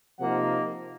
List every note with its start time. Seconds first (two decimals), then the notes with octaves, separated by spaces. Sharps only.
0.20 C3 F3 A#3 D#4 F#5